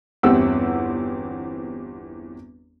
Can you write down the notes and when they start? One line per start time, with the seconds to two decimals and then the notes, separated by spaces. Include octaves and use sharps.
0.23 G1 E2 C4 G4 F#5 E6